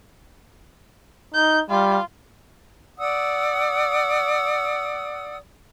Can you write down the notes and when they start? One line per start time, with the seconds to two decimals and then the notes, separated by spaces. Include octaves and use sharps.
1.34 D#4 G6
1.70 G3 F4
2.98 D5 F#5 D#6 E6